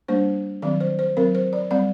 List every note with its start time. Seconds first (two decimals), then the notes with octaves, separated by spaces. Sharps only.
0.08 G3 A#3 D4 C5
0.62 D#3 F#3 C4 D5
0.80 C5
0.99 C5
1.17 F#3 C4 A#4
1.35 C5
1.53 D5
1.71 G3 C4 D5